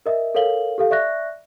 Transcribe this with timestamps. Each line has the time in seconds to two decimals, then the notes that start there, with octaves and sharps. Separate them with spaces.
0.06 A#4 D#5 E5
0.35 A4 A#4 C#5 F5 F#7 G7
0.78 G4 A4 F5
0.91 D5 E5 C#6 F#6 A#6